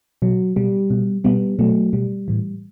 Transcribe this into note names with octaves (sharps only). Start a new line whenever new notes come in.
B2 F#3
B2 G3
B2
B2 G3 B3
B2 F#3 A3
B2 G3
A2 E3